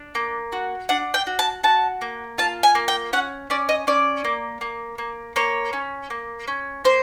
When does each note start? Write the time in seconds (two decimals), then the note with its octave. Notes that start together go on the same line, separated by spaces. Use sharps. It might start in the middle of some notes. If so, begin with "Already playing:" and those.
Already playing: D4
0.15 A#3
0.52 F#4
0.89 D4 F#5
1.14 G5
1.27 F#4
1.39 A5
1.63 F#4 A5
2.01 A#3
2.38 F4 A5
2.63 G#5
2.75 A#3
2.88 G5
3.13 C#4 F#5
3.50 C#4 D5
3.69 D#5
3.87 C#4 D5
4.24 A#3
4.61 A#3
4.98 A#3
5.36 A#3 C#5
5.73 C#4
6.10 A#3
6.48 C#4
6.84 A#3 C5